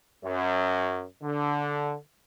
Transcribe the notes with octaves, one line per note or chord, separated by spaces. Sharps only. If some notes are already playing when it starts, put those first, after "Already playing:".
F#2
D3